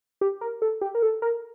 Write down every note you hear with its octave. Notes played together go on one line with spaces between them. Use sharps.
G4
A#4
A4
G4
A#4
A4
A#4